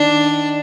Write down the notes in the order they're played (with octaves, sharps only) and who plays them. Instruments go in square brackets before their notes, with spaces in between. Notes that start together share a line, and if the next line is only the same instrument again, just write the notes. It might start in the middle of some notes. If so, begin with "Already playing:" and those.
Already playing: [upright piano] D#3 [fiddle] D4